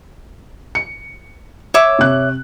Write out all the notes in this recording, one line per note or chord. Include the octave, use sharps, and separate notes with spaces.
C#7
C#5 E5 D6
C3 F#6